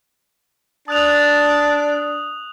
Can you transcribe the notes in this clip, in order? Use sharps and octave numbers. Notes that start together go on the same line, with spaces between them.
D4 A5 D#6 F#6 F7